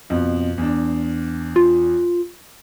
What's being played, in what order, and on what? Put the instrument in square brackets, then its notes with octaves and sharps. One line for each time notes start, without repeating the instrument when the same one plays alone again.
[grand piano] F2 B2
E2 D4
[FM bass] F4